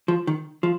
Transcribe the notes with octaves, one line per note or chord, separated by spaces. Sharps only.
F3
D#3
F3